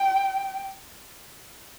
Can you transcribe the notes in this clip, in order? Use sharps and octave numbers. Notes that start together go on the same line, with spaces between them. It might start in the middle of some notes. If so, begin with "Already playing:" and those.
Already playing: G5